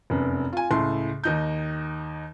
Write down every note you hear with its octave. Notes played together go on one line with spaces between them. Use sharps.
F1 F#2 B3
F4 G#5
C#2 A2 A5 C6
D#2 D#4 G6